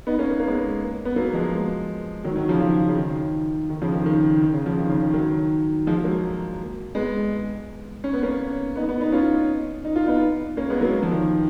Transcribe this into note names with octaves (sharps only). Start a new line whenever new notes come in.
B3 D#4
A#3 C#4
B3
A#3
G#3 B3
B3
F#3 A#3
F3 G#3
D#3 F#3
D#3 F#3
C#3 F3
C#3 F3
C#3
D#3
D#3
C#3 F3
D#3
D#3
D#3
C#3
C#3 F3
D#3
C#3
D#3
D#3 F#3
F3 G#3
F#3 A#3
G#3 B3
C#4
B3
A#3 C#4
B3 D#4
B3 D#4
B3 D#4
C#4 F4
D#4
F4
B3 D#4
A#3 C#4
G#3 B3
F#3 A#3
F3
D#3